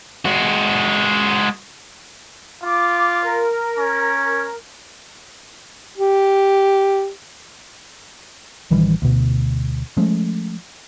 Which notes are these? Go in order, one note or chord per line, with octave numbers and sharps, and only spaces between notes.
G#3 F#4
F4 D6
A#4
C#4
G4
A1 D#3 E3 G3
D2 B2
F3 G#3 A3 C#4